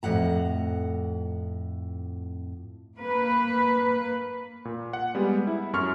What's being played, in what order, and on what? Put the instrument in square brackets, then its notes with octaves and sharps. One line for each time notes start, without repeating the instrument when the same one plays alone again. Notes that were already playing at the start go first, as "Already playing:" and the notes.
[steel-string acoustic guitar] F2 A2 F#5 A#5
[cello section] A#3 B4
[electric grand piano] A#2
F#5
G3 G#3 B3
E4
F#2 C#6 F6